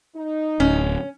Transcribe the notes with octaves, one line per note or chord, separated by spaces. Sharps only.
D#4
D1 C#4